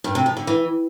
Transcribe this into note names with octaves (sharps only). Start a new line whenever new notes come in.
G2
C3
F3
D3
E3